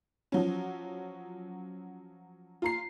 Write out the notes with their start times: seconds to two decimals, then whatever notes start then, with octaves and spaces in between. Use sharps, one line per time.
0.32 F3 F#3 C#4
2.62 F4 A#5 C7